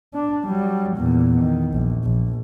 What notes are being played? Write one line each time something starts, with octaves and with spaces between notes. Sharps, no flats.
D4
F#3 G3
E2 A#2
D#3
A#1
A#1